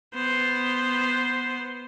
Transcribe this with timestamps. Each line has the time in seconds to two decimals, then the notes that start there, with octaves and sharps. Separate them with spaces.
0.15 B3 C5